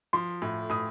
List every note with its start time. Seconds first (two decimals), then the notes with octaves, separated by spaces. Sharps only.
0.13 F3 C6
0.42 A2
0.70 A2 D#6